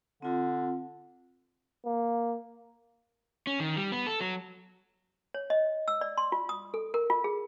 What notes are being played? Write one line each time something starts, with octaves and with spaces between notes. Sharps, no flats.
D3 C4 F4
A#3
C#4
D#3
G3
B3
A4
F#3
C#5
D#5
E6
D5
C6
F4
D#6
A4
A#4
F4
G#4